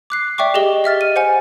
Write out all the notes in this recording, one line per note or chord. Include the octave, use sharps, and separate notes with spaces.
D6 F#6 C7
D5 E5 G5 C#6 D6
G4 G#4 D#5 G7
D#5 E5 F6 A6
D#7
C5 F#5 G#5